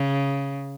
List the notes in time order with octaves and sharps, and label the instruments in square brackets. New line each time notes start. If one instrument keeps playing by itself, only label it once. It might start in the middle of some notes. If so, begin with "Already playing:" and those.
Already playing: [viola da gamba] C#3